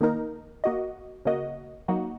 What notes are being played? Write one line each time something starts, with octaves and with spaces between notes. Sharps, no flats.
D#3 A#3 D#4 A#4
A#3 F#4 D#5
C#3 A#3 F#4 D#5
F#3 A#3 D#4 F#4